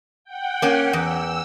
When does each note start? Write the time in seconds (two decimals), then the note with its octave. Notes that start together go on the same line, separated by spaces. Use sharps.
0.24 F#5 G5
0.62 A#3 C#4
0.93 E2 E6